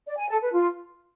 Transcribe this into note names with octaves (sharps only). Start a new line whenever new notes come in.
D5
G#5
A4
B4
F4